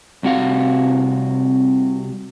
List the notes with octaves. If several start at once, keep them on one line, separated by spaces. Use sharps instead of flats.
C2 C3 F#4 F5